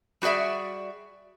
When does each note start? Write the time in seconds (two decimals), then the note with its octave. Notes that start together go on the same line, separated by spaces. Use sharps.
0.22 G3 F#4 G#4 D5 E5